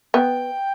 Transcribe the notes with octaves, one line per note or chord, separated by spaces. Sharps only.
B3 G5